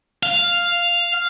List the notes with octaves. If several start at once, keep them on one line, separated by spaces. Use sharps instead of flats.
F5